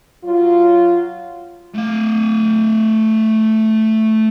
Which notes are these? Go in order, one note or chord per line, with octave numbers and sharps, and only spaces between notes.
F#3 F4
A3 F5